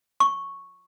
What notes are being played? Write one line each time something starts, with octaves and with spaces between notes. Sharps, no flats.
C#6